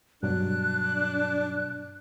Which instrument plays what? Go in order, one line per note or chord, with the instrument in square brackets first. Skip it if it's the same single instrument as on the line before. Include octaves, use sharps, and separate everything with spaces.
[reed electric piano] G2 B2 F#3 [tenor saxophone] D4 [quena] F#6